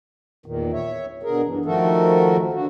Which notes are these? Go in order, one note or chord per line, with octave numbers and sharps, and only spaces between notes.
E2 A#2 D#3
C#5 E5
B2 D3 G#4 A#4
G2 E3
D#3 F3 A3 F#4 A4 A#4
D3 F#4